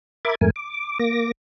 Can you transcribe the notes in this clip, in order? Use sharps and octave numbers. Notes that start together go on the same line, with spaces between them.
A#4 E5 B5 D6 G#6 A6
F2 G#2 A3 A#4 G#5
D6
A#3 D6 A#6